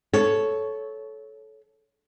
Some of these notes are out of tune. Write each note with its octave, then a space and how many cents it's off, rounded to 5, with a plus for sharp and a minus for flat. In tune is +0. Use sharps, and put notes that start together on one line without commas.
A4 -15 C#5 +0